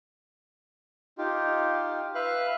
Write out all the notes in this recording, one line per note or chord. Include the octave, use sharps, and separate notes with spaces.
D#4 F4 G4
B4 E5 F5 F#6